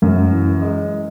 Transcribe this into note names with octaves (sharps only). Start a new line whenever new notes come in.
F#2
E3
G#3